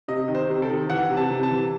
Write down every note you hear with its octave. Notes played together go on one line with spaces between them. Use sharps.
C3 D#5
D#3
C5
C3 C5
A4
D#3
E3 F#5
C3
A5
C3
A5
E3